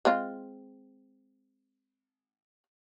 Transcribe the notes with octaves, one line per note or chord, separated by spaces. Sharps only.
G#3 C4 F4